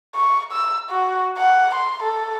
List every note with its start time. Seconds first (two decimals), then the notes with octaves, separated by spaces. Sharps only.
0.15 C#6
0.52 E6
0.91 F#4
1.38 F#5
1.75 C6
2.03 A4